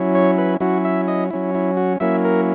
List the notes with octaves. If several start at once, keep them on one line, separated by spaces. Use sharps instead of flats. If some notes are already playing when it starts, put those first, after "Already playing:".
Already playing: F#3 C#4 E4
C#5
B4
F#3 C#4 E4 F#4
E5
D#5
F#3 C#4 E4
E4
F#4
F#3 A#3 C#4 E4 E5
A#4